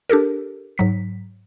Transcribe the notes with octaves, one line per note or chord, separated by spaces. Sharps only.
D4 G4 A4 A#4
G#2 F#3 B6